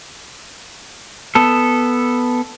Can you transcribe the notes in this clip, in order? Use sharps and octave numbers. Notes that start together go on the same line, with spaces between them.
B3 A4